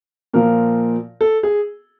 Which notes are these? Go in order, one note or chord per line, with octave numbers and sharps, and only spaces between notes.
A#2 F3 A#4
A4
G#4